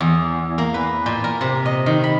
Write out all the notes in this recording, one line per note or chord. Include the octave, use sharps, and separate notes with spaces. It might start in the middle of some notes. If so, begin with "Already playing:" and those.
E2
A#3
B4
A#2
A#4
C3
D#5
D#3
B5